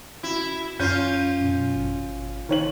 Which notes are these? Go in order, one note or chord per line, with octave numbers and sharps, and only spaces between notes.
E4 F#4
F#2 C#4 F4 G6 C7
F#2 B2
G#1
D#3 C#5 F#7